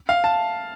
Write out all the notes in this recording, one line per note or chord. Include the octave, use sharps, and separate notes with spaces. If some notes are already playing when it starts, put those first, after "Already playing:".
F5
A5